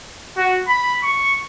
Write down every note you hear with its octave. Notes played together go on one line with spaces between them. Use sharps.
F#4
B5
C#6